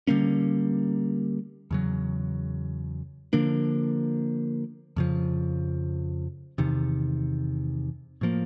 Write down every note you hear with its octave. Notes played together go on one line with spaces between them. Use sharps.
D3 G3 A#3 C#4
E2 C#3 F#3
D3 F3 A#3 D4
F2 C#3 F3
E2 C3 D#3
A2 F3 A#3